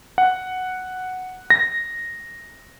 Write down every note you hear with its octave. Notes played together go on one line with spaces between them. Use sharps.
F#5
A#6